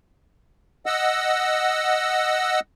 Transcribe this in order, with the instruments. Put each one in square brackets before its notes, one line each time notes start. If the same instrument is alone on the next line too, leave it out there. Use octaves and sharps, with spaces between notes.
[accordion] D#5 F#5 E6